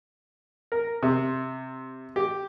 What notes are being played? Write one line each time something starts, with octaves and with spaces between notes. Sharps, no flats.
A#4
C3
G4